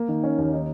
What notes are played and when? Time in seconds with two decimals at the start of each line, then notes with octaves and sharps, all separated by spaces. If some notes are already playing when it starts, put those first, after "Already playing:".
Already playing: A#3
0.09 D#3
0.24 C#4
0.38 D#2
0.53 D#4